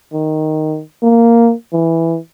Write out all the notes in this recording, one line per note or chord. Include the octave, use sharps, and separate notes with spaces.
D#3
A#3
E3